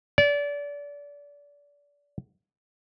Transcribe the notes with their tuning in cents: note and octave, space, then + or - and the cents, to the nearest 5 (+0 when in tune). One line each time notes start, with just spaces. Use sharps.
D5 -30